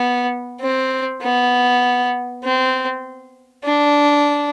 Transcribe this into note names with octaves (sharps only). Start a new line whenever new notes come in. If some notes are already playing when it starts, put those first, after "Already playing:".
Already playing: B3
C4
B3
C4
D4